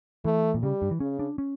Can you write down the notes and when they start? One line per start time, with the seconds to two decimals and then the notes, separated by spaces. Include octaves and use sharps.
0.25 E3 A3
0.54 A#2
0.63 C#3 G3
0.82 G2
0.91 E3
1.00 C#3 C#4
1.19 D4
1.38 C#4